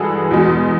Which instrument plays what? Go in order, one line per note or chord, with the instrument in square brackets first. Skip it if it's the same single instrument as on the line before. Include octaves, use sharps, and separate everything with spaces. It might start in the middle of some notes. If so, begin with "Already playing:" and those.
Already playing: [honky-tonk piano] G2 E3 G#3 F#4 G#4 A4
E2 B2 G#3